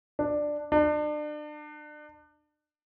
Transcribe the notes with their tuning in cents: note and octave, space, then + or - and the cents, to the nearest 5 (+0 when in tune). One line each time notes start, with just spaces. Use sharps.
D4 +10
D4 +35